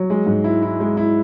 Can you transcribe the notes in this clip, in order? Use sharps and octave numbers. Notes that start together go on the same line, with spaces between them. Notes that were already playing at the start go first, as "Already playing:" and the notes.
Already playing: F#3
G#3
G#2
E4
E4
G#3
E4